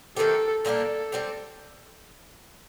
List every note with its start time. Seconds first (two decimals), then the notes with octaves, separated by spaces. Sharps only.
0.16 D#3 A3 C4 G4 A4
0.64 A#2 G3 A#3 D4 A4
1.12 G3 C4 G4